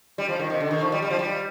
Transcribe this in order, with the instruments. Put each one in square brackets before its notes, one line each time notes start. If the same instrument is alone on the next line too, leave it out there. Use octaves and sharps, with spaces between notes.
[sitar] G3
F3
D#3
C3
D3
D#3
F3
G3
G3
F3
G3